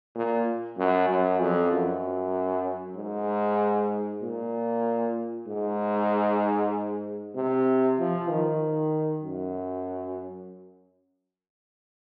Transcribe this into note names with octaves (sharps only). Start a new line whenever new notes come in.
A#2
F#2
F#2
F2
F#2
G#2
A#2
G#2
C3
F3
D#3
F#2